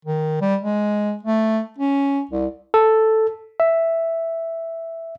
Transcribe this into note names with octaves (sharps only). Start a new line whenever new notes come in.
D#3
G3
G#3
A3
C#4
C2
A4
E5